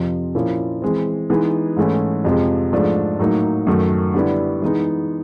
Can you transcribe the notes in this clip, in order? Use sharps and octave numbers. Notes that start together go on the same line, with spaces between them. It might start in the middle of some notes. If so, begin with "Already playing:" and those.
Already playing: F2 C3 F3
A#2 F3 A#3 C#4 E4
E3 G#3 C4
E3 G#3 B3 D#4
G#2 E3 A3 C#4 E4
F2 C3 F3 G#3
G#2 F3 A3 D4
A2 F#3 A#3 D#4
F#2 D#3 F#3 A3
D3 G3 B3 E4
E3 G#3 B3 D#4